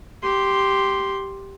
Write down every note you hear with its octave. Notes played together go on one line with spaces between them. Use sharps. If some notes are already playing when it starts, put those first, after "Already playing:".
G4 C6